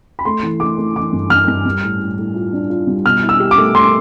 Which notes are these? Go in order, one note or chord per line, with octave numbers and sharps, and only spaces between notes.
B5
A3 C6
E3
A3 D6
A3
E3 D6
G2
G2 F6
G2
G3
A2
A2
A2
F4
D4
F4
G3
B2 F6
E4
E6
G4
D6
A3
A3 C6